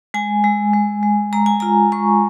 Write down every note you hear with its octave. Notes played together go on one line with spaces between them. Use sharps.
G#3 G#5
G#3
G#3
G#3
G#3 A#5
G#5
F4 A#5
G#3 C#6